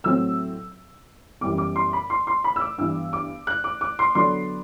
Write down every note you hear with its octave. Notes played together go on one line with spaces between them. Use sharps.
A2 F#3 C4 E6
F#2 E3 G3 B3 D6
D6
C6
B5
C6
C6
B5
E6
D6
G2 E3 B3 E6
D6
F#6
D6
D6
C6
D3 F#3 B3 D4 C6